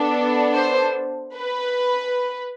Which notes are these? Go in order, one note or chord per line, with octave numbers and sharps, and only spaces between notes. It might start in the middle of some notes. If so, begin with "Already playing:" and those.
Already playing: B3 D4 A4
C5
B4